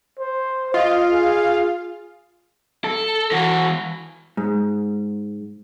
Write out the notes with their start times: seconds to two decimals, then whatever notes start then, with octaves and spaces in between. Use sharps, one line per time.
0.19 C5
0.74 F4 D#5
1.12 G#4
2.84 A4
3.31 E3 F#4
4.37 G#2